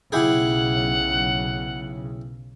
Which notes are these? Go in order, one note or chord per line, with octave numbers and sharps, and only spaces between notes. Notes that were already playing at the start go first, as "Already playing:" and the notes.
B1 C#3 E4 G4 G#4 F#5